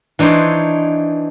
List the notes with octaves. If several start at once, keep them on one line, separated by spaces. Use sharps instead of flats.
E3 D4 D#4 C5 C#5